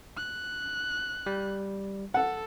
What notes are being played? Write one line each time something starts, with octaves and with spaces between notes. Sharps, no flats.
F#6
G3
A4 F#5